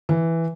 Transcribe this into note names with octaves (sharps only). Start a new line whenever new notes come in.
E3